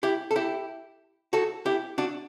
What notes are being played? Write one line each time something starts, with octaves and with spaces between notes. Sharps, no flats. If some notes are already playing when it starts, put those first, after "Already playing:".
E4 G4
A4
E4 G4
F#4 A4
E4 G4
D4 F#4